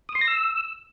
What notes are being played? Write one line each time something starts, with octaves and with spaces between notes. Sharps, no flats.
D#6
C6
A#6
E6